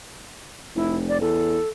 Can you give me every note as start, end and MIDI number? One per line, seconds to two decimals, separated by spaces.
0.76 1.17 29
0.76 0.96 64
1.09 1.18 74
1.21 1.58 40
1.21 1.68 69